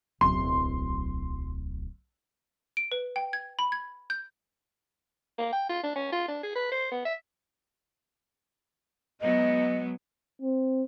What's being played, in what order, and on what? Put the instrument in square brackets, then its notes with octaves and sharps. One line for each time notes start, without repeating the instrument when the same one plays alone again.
[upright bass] D1 B1 [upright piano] C6
[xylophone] D7
B4
G5
G#6
B5
G#6
G6
[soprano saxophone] A#3
G5
F4
D4
C#4
F4
D4
G#4
B4
C5
B3
E5
[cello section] F#3 G#3 B3 [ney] D#5
[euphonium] C4